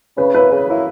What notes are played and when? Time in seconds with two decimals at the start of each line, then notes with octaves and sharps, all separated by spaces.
0.17 C#3 B4
0.34 F#3 A#3 C#4 E4 B4
0.50 C#3
0.67 F#3 A#3 C#4 E4